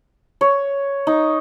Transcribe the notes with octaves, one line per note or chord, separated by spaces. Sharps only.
C#5
D#4